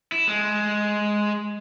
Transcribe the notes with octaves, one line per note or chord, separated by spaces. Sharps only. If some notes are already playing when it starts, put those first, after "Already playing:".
E4
G#3